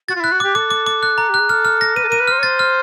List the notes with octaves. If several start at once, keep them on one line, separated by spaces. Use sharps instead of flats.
F#4 A6
F4
E4 F#6
F#4
G4 D6
A4 D6
D6
D6
F#6
A#5
G4 F#6
G#4
A4 F6
F6
A#6
B4 D#7
A4
A#4 D#7
B4
C5 F6
C#5
C5 A6
F6